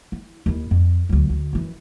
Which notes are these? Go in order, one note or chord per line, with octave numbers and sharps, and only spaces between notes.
E4
D#2 E4
F2
D2 F#3
D2
F#2 E3